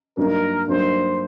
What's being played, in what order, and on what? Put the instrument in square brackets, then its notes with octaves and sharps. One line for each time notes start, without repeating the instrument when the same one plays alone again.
[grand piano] G2 F#3 A#3 D#4 [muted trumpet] A#4
[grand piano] G2 F#3 A#3 D#4 [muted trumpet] C5